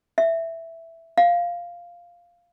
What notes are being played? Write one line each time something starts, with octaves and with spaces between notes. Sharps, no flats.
E5
F5